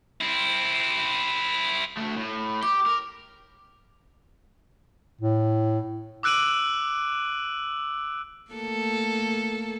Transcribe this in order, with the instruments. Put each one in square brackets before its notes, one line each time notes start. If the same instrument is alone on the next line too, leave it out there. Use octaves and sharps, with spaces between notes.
[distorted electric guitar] C4 E4
[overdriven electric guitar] D2 A3
A2
[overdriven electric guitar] G4 [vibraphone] D6
[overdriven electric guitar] A#4
[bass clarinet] A2
[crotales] D6 E6 F#6 D7 D#7 F#7
[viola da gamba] A3 A#3 A4